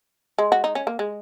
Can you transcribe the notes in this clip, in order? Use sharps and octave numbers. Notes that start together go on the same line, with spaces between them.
G#3
F#4
D#4
C#4
A#3
G#3